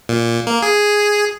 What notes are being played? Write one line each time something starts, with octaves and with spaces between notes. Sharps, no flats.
A#2
A#3
G#4